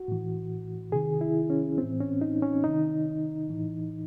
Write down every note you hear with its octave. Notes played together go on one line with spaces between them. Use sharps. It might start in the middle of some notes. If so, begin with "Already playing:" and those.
Already playing: F#4
A2 E3
C3 D#3 G#4
E4
C#4
A2 E3 C4
C#4
D#4
C#4
C3 D#3 D#4
A2 E3